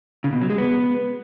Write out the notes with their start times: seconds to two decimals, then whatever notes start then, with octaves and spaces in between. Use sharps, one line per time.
0.24 C#3
0.33 B2
0.41 F#3
0.50 G#3
0.58 B3